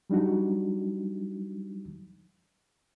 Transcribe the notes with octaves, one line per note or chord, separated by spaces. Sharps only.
F#3 G3 D4 D#4 F#4